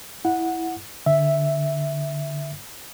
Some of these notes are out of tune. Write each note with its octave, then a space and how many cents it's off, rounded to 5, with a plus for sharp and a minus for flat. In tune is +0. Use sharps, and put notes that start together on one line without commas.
E4 +0 F#5 -10
D3 +0 E5 +0